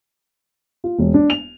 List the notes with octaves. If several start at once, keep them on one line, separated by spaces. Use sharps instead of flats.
F4
E1
D4
F7